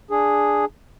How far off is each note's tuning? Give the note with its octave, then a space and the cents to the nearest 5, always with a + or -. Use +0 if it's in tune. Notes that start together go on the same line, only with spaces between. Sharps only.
D4 +0 G#4 +0